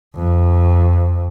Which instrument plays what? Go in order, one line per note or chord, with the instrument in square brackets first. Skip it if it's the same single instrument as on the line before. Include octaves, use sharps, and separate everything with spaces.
[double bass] F2